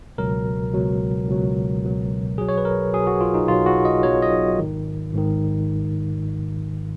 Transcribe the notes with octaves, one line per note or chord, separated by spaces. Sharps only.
C#2 B2 F#3 A#4
C#2 B2 F#3
C#2 B2 F#3
C#2 B2 F#3
B1 B2 F#3 G#4
C#5
B4
A#4
B1 B2 F#3 G#4
F#4
F4
D#4
B1 B2 F#3 F4
F#4
D#5
B1 B2 F#3 C#5
D#5
G#1 G#2 D#3
G#1 G#2 D#3